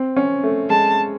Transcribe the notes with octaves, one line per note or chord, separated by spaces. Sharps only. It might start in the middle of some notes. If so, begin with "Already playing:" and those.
Already playing: C4
C#4
A3
G#3 A5